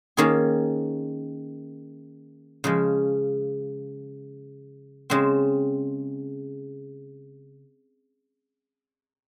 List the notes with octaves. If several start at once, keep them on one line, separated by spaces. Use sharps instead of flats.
D#3 A#3 C#4 G#4 C#5
C#3 F3 G#3
C#3 G#3 C4